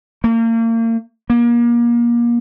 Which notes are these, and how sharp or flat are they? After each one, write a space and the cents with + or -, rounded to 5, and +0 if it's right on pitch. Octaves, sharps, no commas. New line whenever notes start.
A#3 -35
A#3 +30